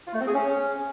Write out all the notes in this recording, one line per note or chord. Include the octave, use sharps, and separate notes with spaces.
F4
A3
C4
G#4
C#4